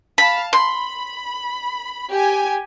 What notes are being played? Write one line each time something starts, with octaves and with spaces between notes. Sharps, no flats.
F5 A5 B5
B5 C6
G4 G#5